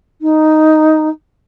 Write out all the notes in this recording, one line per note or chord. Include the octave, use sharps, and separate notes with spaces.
D#4